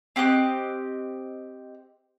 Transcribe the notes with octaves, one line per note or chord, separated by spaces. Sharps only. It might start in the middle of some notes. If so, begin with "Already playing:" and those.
C4 G4 D#5 F#6